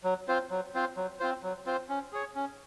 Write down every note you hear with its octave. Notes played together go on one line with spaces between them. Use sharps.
F#3
C4 F4 C5
F#3
C4 F4 C5
F#3
C4 F4 C5
F#3
C4 F4 C5
C#4
G#4 C#5
C#4